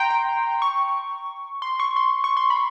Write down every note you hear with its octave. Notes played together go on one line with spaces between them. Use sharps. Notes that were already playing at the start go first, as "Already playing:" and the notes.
Already playing: G5 A#5 C6
G5
C#6
C6
C#6
C6
C#6
C6
B5